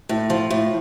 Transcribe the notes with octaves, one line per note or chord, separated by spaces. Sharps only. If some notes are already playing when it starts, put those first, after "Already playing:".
A2 E4
F3
A2